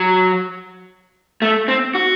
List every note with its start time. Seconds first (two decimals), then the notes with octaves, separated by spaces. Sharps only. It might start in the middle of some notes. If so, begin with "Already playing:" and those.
Already playing: F#3
1.42 A3
1.68 C4
1.95 F#4